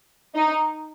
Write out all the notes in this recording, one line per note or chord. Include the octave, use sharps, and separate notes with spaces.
D#4